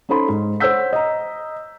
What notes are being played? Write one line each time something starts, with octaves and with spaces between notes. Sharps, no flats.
C#4 D#4 A4 C5 B5 C6
G#2
C5 C#5 F#5 E6 G6 B6
D#5 A#5